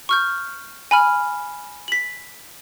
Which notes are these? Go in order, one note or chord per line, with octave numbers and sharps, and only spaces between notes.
C#6 F6 G6
G#5 B5 F6
B6 F#7